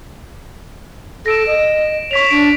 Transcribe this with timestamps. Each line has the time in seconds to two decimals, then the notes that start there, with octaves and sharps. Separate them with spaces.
1.26 A4 A#6 D7 E7
1.47 D#5
2.11 C#5 C#6 B6 F7
2.31 D4 D7